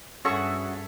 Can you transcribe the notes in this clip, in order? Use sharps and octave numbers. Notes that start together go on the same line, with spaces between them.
G2 C#4 E4 F#4 G#4 A4 E5 C#6